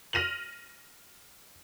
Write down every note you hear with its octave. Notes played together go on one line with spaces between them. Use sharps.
F6 A#6 D#7 F7 F#7